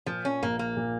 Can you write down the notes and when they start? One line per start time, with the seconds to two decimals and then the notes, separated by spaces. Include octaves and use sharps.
0.06 A#2 F3
0.25 C#4
0.42 A#1 A#3
0.59 A#3
0.77 A#2